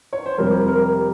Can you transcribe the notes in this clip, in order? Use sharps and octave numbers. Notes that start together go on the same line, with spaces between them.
C#5
C5
F2 C3 G3 A#4
A#4